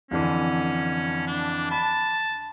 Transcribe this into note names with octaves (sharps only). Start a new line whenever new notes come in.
F2 D3 E3 C#4
D4
A5 B5